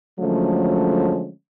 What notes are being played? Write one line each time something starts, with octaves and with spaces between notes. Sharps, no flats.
D3 F3 F#3 G#3 A3 C#4